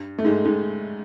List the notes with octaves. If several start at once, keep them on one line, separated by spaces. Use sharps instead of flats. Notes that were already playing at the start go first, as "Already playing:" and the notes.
Already playing: G2
A3
G#2 G#3
G#2 G#3